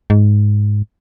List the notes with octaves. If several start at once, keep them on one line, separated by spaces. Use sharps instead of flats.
G#2